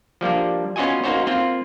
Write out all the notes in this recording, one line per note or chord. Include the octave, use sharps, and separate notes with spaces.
F3 G3 A#3 D4
B3 C#4 F4 F#4 D#5 G#5
A#3 C#4 D#4 F#4 C5 C#5
A#3 C4 F4